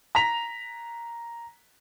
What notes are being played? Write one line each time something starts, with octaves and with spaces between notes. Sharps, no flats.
A#5 B6 F7